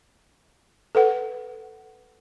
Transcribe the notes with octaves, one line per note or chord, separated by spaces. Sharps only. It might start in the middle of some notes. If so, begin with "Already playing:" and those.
A4 B4 F#5